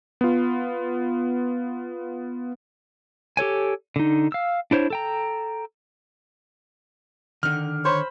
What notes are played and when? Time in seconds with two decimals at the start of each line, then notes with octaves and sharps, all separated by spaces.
0.21 B3 F4
3.37 G4 A4 C#5 G#5
3.96 D3 D#4
4.32 F5 E6
4.71 D4 E4 C5 C#5
4.90 A4 G5 A#5
7.43 D3 D#3 F6
7.85 C5 C#5 B5